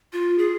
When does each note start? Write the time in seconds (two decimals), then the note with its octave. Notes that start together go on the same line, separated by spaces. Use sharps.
0.13 F4
0.38 G#4